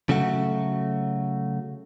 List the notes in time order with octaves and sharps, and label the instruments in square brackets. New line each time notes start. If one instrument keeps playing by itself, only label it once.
[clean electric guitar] C#3 F#3 A3 F#4